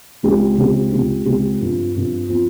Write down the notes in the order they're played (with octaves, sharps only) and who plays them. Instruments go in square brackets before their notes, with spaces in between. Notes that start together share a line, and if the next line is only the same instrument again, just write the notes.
[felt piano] C#2 C#3 G#3 C4 G4
C#2 C#3 G#3 C4 G4
C#2 C#3 G#3 C4 G4
C#2 C#3 G#3 C4 G4
G2 F3 C4 F4
G2 F3 C4 F4
F3 C4 F4